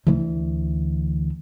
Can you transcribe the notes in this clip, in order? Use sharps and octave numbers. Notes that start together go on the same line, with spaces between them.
D2 E3